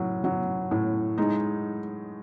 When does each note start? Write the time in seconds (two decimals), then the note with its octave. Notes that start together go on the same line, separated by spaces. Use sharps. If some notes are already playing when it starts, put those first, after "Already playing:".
Already playing: A2 F#3
0.24 F#3
0.71 A2
1.18 G#3 D#4